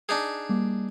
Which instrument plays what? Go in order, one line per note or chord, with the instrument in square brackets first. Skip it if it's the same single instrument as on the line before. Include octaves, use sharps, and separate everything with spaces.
[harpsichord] D4 D#4 G#4
[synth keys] G3 A#3 D6